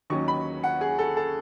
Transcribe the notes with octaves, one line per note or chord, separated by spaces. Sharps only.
D#2 D#3 F#3 C#4 C#6
B5
F#5
G#4
A4
A4